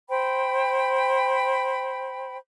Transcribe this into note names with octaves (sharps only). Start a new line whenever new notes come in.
C5 G5 B5